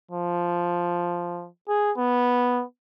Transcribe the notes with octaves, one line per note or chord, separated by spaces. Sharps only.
F3
G#4
B3